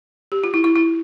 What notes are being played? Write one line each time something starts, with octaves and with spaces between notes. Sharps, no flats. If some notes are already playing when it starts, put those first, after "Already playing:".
G4
F4
E4
E4
E4